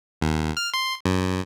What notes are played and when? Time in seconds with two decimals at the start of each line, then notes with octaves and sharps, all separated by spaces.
0.21 D#2
0.57 F6
0.74 C6
1.05 F#2